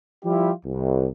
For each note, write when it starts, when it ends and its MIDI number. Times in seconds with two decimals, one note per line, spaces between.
0.25 0.51 53
0.25 0.51 55
0.25 0.51 64
0.25 0.51 65
0.25 0.51 67
0.66 1.07 36